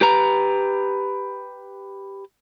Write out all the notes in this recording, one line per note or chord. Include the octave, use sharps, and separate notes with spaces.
G4 B4 A#5